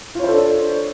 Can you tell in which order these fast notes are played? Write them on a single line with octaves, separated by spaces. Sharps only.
F4 C#5 C5 A4 D4